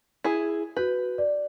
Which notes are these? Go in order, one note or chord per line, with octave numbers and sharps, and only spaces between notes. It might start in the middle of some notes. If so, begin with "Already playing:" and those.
E4 G#4
F#4 B4 G6
D5